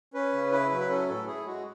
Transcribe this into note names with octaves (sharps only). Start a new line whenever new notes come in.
C#4 B4
C#3
E4 B4
F#3
B4
C#4 A4
A2 A4
E4 G#4
G#3 F#4